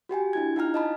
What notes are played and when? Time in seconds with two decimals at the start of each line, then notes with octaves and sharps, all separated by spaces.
0.09 F#4 G4 G5 G#5
0.33 D4 E4 G#6
0.56 D#4 F4 G5 A#5 F6
0.74 D#5 A5 B5